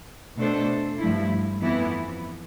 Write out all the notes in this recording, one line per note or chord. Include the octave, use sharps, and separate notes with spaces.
B2 A3 D4 A4 C5
G2 F3 A3 E4
F2 E3 B3 E4